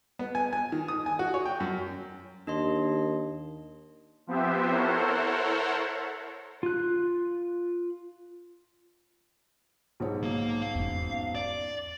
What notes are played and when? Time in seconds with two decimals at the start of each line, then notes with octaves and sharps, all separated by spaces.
0.19 B3
0.35 G#5
0.53 G#5
0.72 D#3
0.88 D#6
1.06 G#5
1.19 F#4
1.34 C#5
1.46 G5
1.60 F#2
2.47 D#2 D4 D#5 C6
4.27 F3 B3 C4 G4 C5 E5
4.71 E4 A4 A#4 C5 C#5 F#5
6.63 F4 F#6
10.00 B1 G#2 C#5
10.23 A#3
10.62 F5
10.75 E2 C#4
11.35 D5